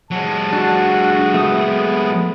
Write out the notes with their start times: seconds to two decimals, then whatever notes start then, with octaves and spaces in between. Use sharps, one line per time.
0.11 F#3 G#3 A5
0.53 D4 F#4
1.34 A3 B3 D#6